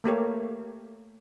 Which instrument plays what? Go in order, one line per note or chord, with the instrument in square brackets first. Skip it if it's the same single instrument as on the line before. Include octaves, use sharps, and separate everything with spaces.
[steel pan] A3 A#3 G4 C#5